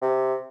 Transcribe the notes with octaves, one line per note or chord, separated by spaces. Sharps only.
C3